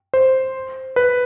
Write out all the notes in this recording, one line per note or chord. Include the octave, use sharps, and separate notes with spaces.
C5
B4